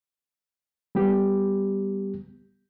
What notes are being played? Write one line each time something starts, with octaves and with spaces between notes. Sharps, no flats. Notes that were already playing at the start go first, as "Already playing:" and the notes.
G3 B3 G4